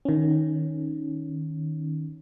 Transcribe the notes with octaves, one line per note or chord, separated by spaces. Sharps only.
D#3 C#4